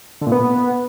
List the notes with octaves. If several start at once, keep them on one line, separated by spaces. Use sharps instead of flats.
D3
A#2
B3